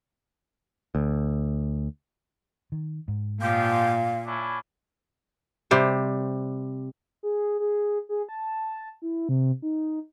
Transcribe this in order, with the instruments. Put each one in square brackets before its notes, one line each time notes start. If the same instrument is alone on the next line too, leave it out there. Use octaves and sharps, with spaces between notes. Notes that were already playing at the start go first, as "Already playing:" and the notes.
[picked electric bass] D2
[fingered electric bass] D#3
G#2
[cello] A#2 [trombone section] F3 G4 [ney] F5
[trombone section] C#4 D4 E4
[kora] C3 G3 C5
[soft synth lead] G#4
G#4
G#4
A5
E4
C3
D#4